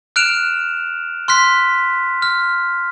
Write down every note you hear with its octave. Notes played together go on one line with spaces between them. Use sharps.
F6 F#6 D7 E7 F7
C6 F6 F#6 B6
F6